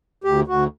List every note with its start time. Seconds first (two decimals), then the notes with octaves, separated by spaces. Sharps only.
0.24 D2 G4
0.47 D2 F#4